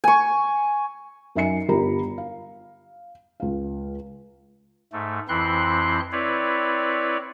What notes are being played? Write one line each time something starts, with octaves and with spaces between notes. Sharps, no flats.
G#5 C#6
F#2 D#4 E5 G#5 C7 C#7
G1 F4 G4 A#4 A#5 B5
F5
C#2 F5
G#2 A3
F2 E3 C4 E4 C6 F#6
C4 E4 B4 C#5 D5